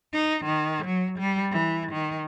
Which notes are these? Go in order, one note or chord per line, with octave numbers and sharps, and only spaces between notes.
D#4
D#3
F#3
G3
E3
D#3